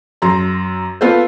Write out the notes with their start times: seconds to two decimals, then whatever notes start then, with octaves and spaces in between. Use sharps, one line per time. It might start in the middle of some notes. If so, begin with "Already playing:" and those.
0.22 F#2 A#5 C6
1.01 B3 F4 A4 C5